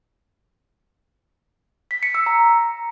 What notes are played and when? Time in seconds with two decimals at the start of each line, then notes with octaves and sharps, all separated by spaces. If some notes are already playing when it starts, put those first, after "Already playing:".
1.91 B6
2.03 C#7
2.15 E6
2.26 A#5